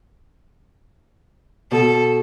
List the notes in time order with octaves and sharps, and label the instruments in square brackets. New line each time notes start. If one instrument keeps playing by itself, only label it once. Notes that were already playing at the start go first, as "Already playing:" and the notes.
[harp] B2 [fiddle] A4